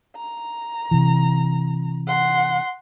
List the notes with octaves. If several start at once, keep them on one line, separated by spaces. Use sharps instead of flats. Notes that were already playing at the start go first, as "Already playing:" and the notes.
A#5
C3 E3
F#5 C6